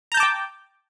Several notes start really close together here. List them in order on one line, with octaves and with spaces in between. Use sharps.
A#5 G6 A5 D6 G5